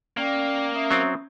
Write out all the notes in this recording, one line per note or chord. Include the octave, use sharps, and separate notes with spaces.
A#3 C#4 D5 G5
C#4 E5 D#6
F#3 C4